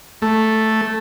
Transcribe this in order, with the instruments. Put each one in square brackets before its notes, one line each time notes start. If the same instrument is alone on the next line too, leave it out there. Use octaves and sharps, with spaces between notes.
[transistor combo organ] A3